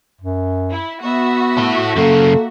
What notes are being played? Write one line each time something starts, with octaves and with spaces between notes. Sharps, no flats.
F#2
E4
B3 F#4 E5
E4 A4
F#2 C#3 A#3 A4